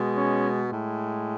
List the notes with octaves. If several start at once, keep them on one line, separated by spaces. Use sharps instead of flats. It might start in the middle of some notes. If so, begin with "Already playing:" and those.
Already playing: B2 G#3
C#4
A2 G#3